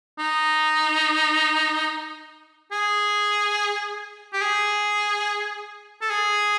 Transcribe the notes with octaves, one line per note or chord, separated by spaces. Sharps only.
D#4
G#4
G4
G#4
A4
G#4